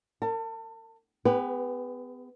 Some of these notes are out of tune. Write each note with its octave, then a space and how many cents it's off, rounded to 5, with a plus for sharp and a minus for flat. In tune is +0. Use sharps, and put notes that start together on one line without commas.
A#4 -40 A5 +30
B3 +35 G#4 -45 B4 +0